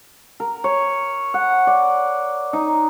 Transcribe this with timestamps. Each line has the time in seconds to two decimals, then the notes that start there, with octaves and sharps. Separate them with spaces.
0.40 A#4
0.64 C#5
1.34 F#5
1.67 D5
2.53 D#4